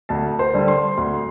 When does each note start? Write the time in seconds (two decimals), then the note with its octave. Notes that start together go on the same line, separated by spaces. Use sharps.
0.09 D2 A5
0.39 C5
0.54 D3 G3
0.68 C6
0.98 D2 C6